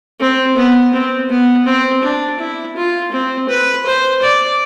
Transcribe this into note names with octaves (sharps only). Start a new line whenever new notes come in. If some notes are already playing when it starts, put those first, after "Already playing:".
C4
B3
C4
B3
C4
D4
E4
F4
C4
B4
C5
D5